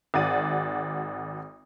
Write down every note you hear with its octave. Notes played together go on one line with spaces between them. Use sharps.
G#1 G#2 F#4 D5 D#7